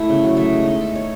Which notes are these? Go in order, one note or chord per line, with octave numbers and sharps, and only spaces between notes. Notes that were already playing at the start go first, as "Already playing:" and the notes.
Already playing: A3 E4
C#3
F#3
A3
G#3
D#4
A4
C#5